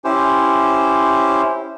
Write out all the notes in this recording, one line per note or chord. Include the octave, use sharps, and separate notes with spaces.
C#4 E4 G4 C5